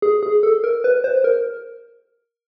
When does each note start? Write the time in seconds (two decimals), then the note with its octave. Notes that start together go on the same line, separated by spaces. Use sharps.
0.02 G#4
0.23 G#4
0.43 A4
0.64 A#4
0.84 B4
1.04 C5
1.24 A#4